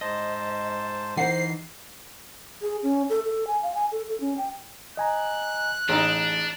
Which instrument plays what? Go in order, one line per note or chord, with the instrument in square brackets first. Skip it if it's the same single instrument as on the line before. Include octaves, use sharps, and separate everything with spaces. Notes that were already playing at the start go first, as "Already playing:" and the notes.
[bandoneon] G#2 C5 A5 [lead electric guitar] D#5
[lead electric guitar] E3 D#4 [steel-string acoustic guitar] C5 F#5 [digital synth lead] C7
[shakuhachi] G#4
C#4
A4
A4
G#5
F5
G#5
A4
A4
C#4
G5
[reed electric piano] D#5 G#5 A#5 [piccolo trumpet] F#6
[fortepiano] A1 D#4 [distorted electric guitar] D4 [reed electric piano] G#4